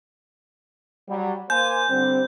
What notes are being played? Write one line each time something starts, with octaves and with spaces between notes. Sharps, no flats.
F#3 G3
A#3 C5 G#5 G6
D3 G3 C4